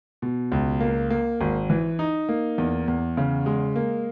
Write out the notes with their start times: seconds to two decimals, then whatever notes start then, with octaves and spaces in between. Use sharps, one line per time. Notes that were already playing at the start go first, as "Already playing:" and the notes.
0.22 B2
0.52 C#2
0.80 A#3
1.10 A#3
1.41 G#1
1.70 E3
1.99 D#4
2.29 A#3
2.58 E2
2.88 E2
3.17 C#3
3.46 G#3
3.76 A#3